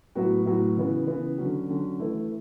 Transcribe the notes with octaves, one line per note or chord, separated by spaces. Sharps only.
A2 F#3 B3 F#4
A2 F#3 B3 F#4
C#3 E3 B3
C#3 E3 B3
D3 F#3 C#4 F#4
D3 F#3 C#4 F#4
E3 A3 E4